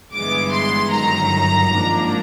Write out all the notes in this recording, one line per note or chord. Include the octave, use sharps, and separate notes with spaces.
G1 G2 E3 G#3 B3 D6
C6
G1 F#2 D#3 A#5
G#1 G#2 F3 A#3 D4